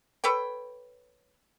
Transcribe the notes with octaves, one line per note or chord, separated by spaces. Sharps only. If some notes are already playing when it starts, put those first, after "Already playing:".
A4 B4 C#5 G5